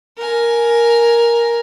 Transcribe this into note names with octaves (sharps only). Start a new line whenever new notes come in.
A#4 G#5